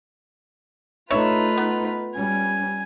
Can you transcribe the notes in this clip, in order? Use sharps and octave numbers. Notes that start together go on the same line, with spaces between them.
A3 D#4 F4 B4 C#5 E5
B3
G3 C#4 G#5